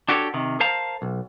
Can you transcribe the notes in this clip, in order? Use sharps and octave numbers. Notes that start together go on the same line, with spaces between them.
D4 F#4 G4 A4 B4 C#5
C3 D#3
A#4 C5 F5 A5 A#5
B1